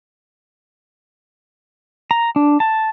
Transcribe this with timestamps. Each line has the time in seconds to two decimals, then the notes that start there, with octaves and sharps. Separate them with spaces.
2.11 A#5
2.36 D4
2.60 A5